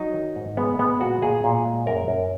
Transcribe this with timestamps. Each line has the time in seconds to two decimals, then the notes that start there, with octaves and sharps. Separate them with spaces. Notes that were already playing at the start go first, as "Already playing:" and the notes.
Already playing: F#3 D#4
0.14 D#3
0.36 G#2
0.57 G#3 B3
0.79 G#3 B3
1.00 A#2 F#4
1.22 A#2 G#4
1.44 A#2
1.65 G#3
1.86 F#2 A#4
2.08 F#2